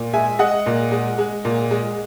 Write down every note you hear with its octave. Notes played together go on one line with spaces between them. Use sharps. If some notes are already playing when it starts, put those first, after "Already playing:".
Already playing: A#2
G#3 E5 G#5
G#3 D#5 F#5
A#2
G#3
G#3
A#2
G#3